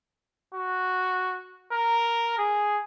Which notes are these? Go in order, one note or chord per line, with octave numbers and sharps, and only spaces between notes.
F#4
A#4
G#4